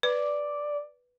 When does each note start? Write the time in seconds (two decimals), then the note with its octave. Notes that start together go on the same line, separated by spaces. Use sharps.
0.03 B4 D5